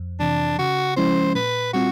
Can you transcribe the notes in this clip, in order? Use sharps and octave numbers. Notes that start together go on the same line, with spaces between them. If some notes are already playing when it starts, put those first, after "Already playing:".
Already playing: F2
C3 E3 D4
C#3 F#4
F3 G#3 C#4 E4 C5
A#2 B4
G3 C4 F4 F#4